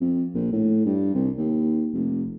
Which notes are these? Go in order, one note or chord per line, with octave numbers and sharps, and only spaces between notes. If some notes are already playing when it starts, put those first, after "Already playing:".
F2
A#1
A2
G2
C2
D#2
F1